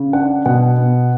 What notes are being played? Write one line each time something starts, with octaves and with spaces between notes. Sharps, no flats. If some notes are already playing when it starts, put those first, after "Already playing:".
Already playing: C#3
D4 F#5
B2 F#5
B3